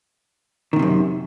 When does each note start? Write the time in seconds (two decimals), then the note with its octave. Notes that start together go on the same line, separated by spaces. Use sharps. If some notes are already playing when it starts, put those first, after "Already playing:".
0.73 D#3
0.76 A2
0.79 C3
0.82 F#2